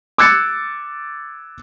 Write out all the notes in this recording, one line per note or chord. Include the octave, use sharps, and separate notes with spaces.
D6 E6 F#6 G#6 A6 C#7